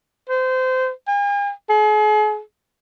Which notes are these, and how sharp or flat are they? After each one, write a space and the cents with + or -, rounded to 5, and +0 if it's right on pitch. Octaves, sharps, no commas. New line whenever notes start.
C5 -25
G#5 -45
G#4 +40